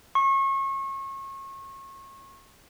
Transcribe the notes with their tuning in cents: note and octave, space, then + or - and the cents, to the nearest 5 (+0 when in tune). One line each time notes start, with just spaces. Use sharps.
C#6 -30